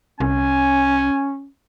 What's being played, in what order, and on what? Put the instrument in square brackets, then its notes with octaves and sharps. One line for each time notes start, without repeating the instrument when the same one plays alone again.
[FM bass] C2 [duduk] C#4 [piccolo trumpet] G#5